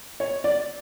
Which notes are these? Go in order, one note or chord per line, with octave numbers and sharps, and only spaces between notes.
C#5
D5